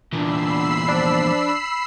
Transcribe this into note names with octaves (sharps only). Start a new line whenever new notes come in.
E2 A#2 D4 B5 E6 C7
F3 D4